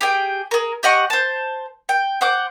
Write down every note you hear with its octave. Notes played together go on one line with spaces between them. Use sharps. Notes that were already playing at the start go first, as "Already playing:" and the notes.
G4 G#4 G5
G#4 A#4
G4 D#5 F#5 C#6
C5 A5
G5
C5 F#5 D6